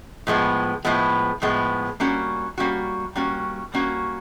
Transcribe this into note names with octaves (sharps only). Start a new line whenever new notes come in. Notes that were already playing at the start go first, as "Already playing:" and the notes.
A2 F3 G#3 B3
A2 F3 G#3 B3
A2 F3 G#3 B3
G3 A#3 C#4 F#4
G3 A#3 C#4 F#4
G3 A#3 C#4 F#4
G3 A#3 C#4 F#4